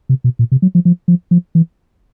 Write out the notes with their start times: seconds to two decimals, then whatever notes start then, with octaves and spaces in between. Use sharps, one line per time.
0.09 C3
0.24 B2
0.39 A#2
0.52 C3
0.62 F#3
0.75 F3
0.85 F3
1.08 F3
1.31 F3
1.55 E3